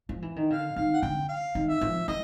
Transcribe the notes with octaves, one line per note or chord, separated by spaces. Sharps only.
F3
E3
D#3
D3 F5
D#3 F5
F#5
D3 G5
F5
D#3
E5
F3
E3 D#5